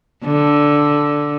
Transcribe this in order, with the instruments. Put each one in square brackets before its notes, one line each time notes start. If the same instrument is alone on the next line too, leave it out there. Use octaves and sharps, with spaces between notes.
[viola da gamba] D3